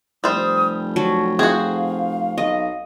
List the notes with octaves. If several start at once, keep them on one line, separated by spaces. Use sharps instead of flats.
F1 G3 C5 D#6
F#3 A5
C4 F#4 G#4 F5
B1 D#5